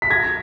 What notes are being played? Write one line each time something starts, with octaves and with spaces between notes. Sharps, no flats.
B6
G#6 A#6